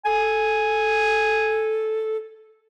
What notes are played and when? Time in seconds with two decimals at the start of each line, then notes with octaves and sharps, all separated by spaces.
0.05 A4 G#5